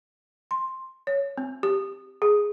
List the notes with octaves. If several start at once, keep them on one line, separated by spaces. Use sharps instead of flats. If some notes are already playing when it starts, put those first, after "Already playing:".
C6
C#5
C4
G4
G#4